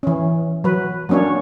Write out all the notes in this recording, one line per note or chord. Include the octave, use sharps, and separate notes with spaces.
E3 C#4
F#3 B4
F#3 A#3 C#4 D4 C#5